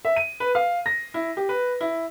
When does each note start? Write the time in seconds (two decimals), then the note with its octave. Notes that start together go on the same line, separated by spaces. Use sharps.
0.05 E5
0.16 D#7
0.40 B4
0.55 F5
0.86 A#6
1.14 E4
1.37 G4
1.49 B4
1.81 E4